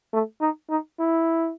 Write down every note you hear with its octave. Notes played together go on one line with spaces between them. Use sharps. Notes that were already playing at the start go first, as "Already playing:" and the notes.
A3
D#4
D#4
E4